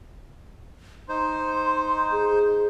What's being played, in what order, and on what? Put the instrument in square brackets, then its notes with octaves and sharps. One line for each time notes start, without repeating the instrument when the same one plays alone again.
[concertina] D#4 C5 [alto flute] C6
[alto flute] G#4